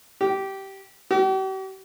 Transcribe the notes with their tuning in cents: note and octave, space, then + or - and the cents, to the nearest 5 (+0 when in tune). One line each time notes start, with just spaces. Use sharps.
G4 -15
G4 -45